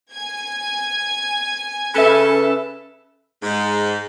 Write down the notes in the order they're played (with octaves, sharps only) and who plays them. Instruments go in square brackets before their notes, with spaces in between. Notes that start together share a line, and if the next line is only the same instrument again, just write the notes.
[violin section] G#5 G#6
[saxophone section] C#3 A4 [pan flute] C#4 [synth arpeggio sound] B4 E5
[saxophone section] G#2